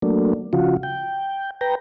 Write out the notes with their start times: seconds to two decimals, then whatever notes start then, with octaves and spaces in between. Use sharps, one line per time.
0.02 F#3 A3 A#3 D4
0.53 C#3 F3 F4 F#4
0.83 G5
1.61 B4 G5 A#5